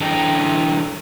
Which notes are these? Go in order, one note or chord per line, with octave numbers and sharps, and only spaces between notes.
E3 D4 A4 D#5 G5 A#5